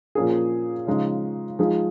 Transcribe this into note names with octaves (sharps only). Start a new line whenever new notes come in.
A#2 F3 A#3 C#4 G#4
C#3 F3 G#3 D#4
F3 G#3 D#4 G#4